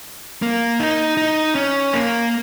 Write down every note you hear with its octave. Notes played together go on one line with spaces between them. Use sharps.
A#3
D#4
D#4
C#4
A#3